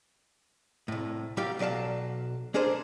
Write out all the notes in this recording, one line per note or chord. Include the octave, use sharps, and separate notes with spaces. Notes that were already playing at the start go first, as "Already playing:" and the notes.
C2 A2
F#3 A#3 G4 F5 G5
B1 F#3 D5 F5 A5
A#3 D4 G#4 A4 C5